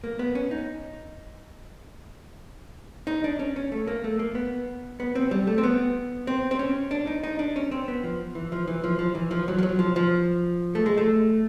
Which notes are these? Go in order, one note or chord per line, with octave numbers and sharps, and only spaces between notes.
A#3
B3
C#4
D#4
D#4
D4
C#4
C#4
A3
A#3
A3
A#3
B3
B3
C4
G3
A3
C4
B3
C4
C4
C#4
D4
D#4
D#4
D4
C#4
C4
B3
F3
E3
F3
E3
F3
F3
E3
F3
F#3
F3
F#3
F3
F3
A3
G#3
A3